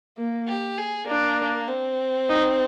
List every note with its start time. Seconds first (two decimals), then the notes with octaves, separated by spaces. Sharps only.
0.18 A#3
0.48 G4
0.78 G#4
1.08 A#3 D4
1.68 C4
2.29 D#4